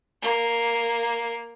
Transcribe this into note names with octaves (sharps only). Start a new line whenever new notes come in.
A#3